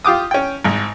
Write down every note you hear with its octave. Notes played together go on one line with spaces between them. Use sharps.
F4 G4 D6 D#6
C#4 G5
G#1 G#2